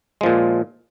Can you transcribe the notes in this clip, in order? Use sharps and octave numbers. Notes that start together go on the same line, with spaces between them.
A#2 F3 G#3